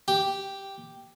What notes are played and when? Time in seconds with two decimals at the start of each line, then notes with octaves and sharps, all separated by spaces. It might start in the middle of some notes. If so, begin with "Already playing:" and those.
0.08 G4